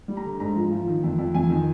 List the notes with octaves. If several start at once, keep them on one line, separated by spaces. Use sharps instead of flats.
G3
A#5
D3
G#2 A#5
F3
F3
D#3
F2
F2
F2 G#5
D#3